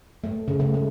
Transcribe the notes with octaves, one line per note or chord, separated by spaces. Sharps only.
A3
C#3
A3
G#3